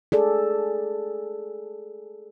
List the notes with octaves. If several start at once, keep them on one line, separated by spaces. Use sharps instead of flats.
G#4 A4 D5